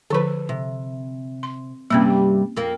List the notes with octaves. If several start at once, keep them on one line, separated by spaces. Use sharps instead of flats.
D3 F3 A4 B4 C5
C3
C6
G2 C3 G3 A#3 C4 C#4
G4
F2 A#3